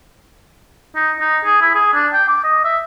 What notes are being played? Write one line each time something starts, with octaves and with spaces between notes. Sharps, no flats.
D#4
D#4
G#4
E4
G#4
D4
G5
D6
D#5
E5